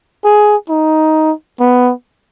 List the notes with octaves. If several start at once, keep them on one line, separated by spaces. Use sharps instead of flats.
G#4
D#4
B3